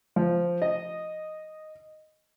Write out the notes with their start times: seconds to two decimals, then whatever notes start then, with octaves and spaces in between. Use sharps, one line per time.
0.16 F3
0.62 D#5